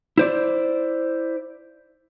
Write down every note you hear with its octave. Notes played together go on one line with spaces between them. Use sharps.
E4 C5 D5